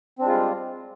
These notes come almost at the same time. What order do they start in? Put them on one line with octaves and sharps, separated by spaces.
C4 D4 G#3 F4 G3